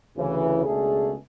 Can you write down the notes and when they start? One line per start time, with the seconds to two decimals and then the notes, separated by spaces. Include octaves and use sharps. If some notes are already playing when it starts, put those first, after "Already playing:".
0.15 D2 C#3 E3
0.65 C#2 B2 A3 D4 G#4